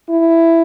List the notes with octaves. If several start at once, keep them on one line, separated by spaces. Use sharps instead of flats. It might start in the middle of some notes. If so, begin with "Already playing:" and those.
E4